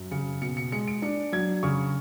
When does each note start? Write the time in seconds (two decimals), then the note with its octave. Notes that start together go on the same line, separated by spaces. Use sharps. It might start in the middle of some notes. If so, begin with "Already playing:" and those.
Already playing: F#2
0.11 C#3 C#7
0.42 B2 C#7
0.57 C#7
0.72 G#3 C#7
0.88 D7
1.02 D4 C#7
1.32 F#3 G#6
1.63 C#3 C#6